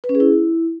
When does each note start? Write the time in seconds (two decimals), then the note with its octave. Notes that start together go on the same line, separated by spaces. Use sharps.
0.04 B4
0.09 C#4
0.15 G#4
0.20 E4